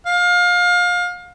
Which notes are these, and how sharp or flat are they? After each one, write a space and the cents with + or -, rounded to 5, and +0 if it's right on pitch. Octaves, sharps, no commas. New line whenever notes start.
F5 +30